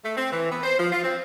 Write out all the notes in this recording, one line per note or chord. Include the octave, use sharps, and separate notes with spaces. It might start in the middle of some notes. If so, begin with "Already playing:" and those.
A3
C4
E3
B3
C5
F3
F4
C4